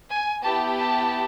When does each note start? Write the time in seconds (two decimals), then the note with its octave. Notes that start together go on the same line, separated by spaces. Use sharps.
0.11 G#5
0.43 B3 E4 G4 A5
0.76 A5